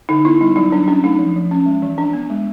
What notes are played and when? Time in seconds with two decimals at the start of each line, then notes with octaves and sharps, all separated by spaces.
0.09 D3 D#4
0.25 B3 E4
0.41 G3 D#4
0.56 F#3 D#4
0.72 F#3 D4
0.88 C#4 D4
1.04 A3 D#4
1.19 F3
1.36 F3
1.51 C#4
1.66 G#3
1.82 E3
1.98 D4
2.13 B3
2.30 G#3